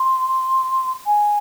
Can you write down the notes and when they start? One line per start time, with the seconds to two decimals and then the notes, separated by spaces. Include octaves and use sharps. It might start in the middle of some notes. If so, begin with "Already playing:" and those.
Already playing: C6
1.05 G#5